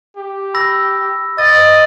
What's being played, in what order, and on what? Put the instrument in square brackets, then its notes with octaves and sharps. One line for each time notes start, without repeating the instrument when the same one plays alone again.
[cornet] G4
[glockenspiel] B5 E6 A#6
[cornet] D#5 [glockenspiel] A6